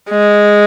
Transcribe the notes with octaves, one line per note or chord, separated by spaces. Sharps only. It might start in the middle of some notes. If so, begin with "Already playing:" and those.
G#3